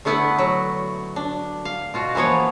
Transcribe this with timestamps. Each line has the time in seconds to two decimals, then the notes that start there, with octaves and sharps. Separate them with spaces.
0.05 D3 A3 B3 E4 B4 F#5
0.38 F#3
1.16 D4
1.65 F5
1.94 B2 F4 F#4
2.15 E3 F3 A#3 B3 C#5